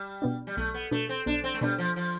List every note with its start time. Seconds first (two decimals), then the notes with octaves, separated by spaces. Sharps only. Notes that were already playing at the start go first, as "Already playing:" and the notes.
Already playing: G3
0.22 B2 B3 D4
0.47 G3
0.57 B1 A3
0.74 B3
0.91 B2 A3 B3 D4
1.09 C4
1.26 B1 D4
1.44 C4
1.54 A3
1.61 B2 G3 B3 D4
1.78 F3
1.96 F3